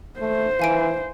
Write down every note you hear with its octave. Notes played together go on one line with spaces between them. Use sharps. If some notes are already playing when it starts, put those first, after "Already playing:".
A3 C5
E3 F5 G#5 D7